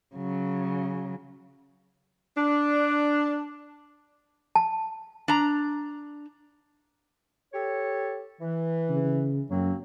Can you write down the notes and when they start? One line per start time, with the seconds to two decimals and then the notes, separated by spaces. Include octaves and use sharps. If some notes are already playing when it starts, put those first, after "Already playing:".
0.16 C#3 F#3
2.37 D4
4.55 A5
5.28 D4 A#5
7.53 G4 A4 C#5
8.41 E3
8.90 C#3
9.50 F#2 F#3 A#3 C4